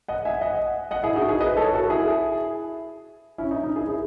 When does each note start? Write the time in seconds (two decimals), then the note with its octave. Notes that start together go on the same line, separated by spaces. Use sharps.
0.08 D#5 F#5
0.25 E5 G#5
0.41 D#5 F#5
0.91 D#5 F#5
1.03 E4 G#4
1.16 D#4 F#4
1.28 E4 G#4
1.40 B4 D#5
1.57 A4 C#5
1.73 F#4 A4
1.90 E4 G#4
3.38 C#4 E4
3.51 D#4
3.63 D#4
3.76 E4 G#4
3.88 E4 G#4